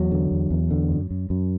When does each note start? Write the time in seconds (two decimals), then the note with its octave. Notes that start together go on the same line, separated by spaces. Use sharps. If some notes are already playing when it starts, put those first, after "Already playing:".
Already playing: E2 F#3
0.12 D3
0.31 E2
0.50 E2
0.71 D3
0.91 F#2
1.11 F#2
1.30 F#2